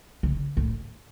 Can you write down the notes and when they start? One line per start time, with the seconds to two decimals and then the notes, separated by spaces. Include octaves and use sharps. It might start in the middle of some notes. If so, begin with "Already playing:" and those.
0.23 C#3
0.57 A2